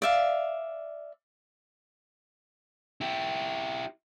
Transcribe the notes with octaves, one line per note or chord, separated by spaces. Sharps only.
D5 E5 F5
E4 G4